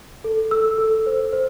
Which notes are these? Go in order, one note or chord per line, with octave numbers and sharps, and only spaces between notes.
A4
A4 E6
A4
C5
C5